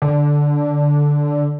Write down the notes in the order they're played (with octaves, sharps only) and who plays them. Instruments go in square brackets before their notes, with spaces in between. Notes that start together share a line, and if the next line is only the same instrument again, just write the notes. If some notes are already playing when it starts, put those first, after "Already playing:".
[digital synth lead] D3